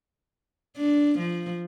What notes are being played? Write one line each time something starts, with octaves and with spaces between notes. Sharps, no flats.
D4
F3